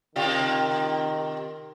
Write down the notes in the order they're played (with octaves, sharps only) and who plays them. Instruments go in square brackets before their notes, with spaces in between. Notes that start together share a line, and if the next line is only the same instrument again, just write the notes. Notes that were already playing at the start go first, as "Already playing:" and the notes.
[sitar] C3 F4 G4 [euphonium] D#3